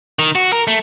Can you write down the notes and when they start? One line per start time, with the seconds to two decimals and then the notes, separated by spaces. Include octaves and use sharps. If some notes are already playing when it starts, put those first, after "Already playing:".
0.19 D#3
0.35 F#4
0.53 A#4
0.67 A3